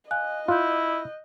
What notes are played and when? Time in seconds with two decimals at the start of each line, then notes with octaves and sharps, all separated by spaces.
0.11 D#5 F5 G#5 F#6
0.48 E4 F4 F#6 G6